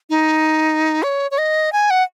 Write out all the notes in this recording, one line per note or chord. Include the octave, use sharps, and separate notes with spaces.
D#4
C#5
C#5
D#5
G#5
F#5